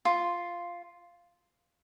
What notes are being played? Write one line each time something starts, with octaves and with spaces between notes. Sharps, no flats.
F4